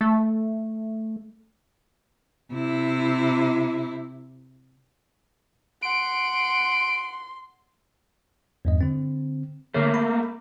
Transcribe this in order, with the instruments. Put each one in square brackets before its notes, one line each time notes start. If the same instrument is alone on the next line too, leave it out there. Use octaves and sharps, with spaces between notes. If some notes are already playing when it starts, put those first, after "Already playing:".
[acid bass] A3
[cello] C3 E4
[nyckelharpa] F#5 [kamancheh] C6 [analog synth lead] D7
[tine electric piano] E2 G2 D#5
D3 C4
[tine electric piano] D3 C#5 [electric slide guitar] A3 A#3
[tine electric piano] B5